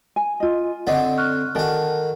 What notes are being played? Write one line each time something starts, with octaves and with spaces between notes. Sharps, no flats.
G#5
F4 D#5
D3 C4 D5 D#5 F#5
C#6 F6 F#6
D#3 F#4 A4 A#4 D5 F#5 G#5 A5